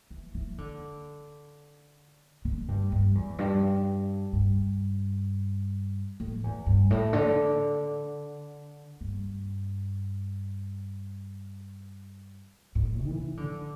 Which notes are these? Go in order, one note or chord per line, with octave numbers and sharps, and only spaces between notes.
E3
E3
D3
D3
G2
G2
E2
G2
G2
A2
E2
G2
A2
D3
G2
A2
E3
D3